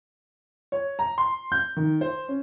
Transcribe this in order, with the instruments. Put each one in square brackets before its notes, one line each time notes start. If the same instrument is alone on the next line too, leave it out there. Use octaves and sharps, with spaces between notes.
[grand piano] C#5
A#5
C6
G6
D#3
C5
C#4